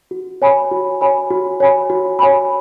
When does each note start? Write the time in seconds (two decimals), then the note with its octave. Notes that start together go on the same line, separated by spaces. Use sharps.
0.11 F#4
0.42 C#5 G#5 B5
0.72 F#4
1.01 C#5 G#5 B5
1.30 F#4
1.60 C#5 G#5 B5
1.90 F#4
2.19 C#5 G#5 B5